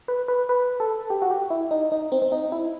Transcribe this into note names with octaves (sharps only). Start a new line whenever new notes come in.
B4
B4
B4
A4
G4
F#4
G4
E4
D#4
D#4
C4
C4
D#4
E4